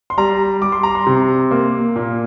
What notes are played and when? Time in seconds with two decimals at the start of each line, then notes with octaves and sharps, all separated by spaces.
0.10 C6
0.17 G3 A#5
0.62 G3 D6
0.72 C6
0.83 A#5
0.95 C6
1.06 C3
1.51 A#3
1.96 A#2